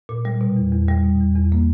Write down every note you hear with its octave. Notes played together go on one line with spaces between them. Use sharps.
A#2
G3
B2
E2
E2
G3
B2
E2
E2
A#3